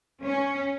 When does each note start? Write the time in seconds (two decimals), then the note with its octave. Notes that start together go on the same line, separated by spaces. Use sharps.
0.22 C#4